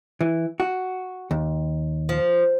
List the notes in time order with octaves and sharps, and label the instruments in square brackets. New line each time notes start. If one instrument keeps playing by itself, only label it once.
[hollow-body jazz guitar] E3
F#4
D#2
[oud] F3